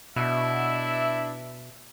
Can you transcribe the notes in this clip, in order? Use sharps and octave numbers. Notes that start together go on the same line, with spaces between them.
B2 D4 E4 E5